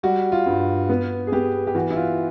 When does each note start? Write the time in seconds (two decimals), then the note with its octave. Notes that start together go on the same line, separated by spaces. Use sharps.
0.03 G3 F#4
0.32 F4
0.46 G2
0.89 B3
1.27 G#4
1.32 B3 G4
1.67 G4
1.75 E3 F#4
1.91 E4
1.96 F4